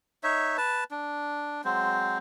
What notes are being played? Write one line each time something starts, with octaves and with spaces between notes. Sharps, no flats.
D#4 C#5 E5
B4 A5
D4
F#3 G#3 C4 C5